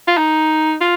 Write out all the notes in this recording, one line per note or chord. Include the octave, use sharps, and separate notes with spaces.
F4
D#4
F4